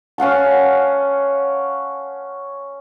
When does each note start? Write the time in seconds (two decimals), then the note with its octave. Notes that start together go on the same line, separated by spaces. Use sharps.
0.18 C#4 F5 F#5 A5